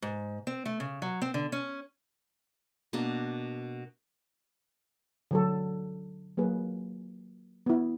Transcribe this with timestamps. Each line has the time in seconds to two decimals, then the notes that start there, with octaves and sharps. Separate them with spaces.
0.02 G#2
0.47 C4
0.66 A3
0.80 C#3
1.02 F#3
1.22 C4
1.34 D3
1.52 C#4
2.93 B2 A#3 D4
5.31 D3 F#3 A4
6.37 F#3 A#3 G#4 B4
7.66 B3 E4